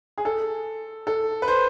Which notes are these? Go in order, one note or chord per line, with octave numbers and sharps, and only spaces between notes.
G#4
A4
A4
B4
C5